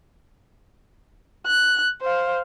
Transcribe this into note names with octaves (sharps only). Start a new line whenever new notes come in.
F#6
C5 F5